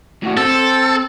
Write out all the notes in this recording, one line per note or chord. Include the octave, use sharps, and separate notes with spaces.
A2 F#4
C4 A4